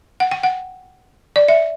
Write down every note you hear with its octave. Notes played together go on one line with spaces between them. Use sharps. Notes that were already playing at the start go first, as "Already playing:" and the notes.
F#5
G5
F#5
D5
E5